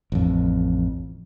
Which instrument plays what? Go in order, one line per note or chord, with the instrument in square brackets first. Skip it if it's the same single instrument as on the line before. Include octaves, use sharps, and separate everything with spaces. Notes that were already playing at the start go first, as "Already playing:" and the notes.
[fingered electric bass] A1 F2